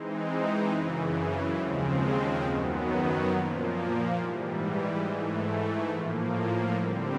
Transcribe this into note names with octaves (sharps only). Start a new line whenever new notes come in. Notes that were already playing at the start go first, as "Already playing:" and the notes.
Already playing: E3 G#3 C4 D#4
F#2 C#3 E3
D#2 C#3 F3 G#3 C4
F#2 D#3 F#3 B3
A#2 F3 A#3
G#2 E3 G3
G#2 E3 A3
A2 F3 A#3
D3 G3 C4